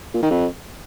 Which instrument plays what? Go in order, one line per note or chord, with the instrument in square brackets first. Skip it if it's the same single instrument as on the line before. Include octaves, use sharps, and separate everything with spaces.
[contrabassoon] A#2
D#3
F2